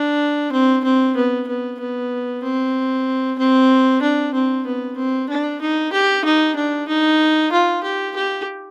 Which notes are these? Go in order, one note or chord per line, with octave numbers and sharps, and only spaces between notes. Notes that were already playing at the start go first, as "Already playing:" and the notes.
Already playing: D4
C4
C4
B3
B3
B3
C4
C4
D4
C4
B3
C4
D4
D#4
G4
D#4
D4
D#4
F4
G4
G4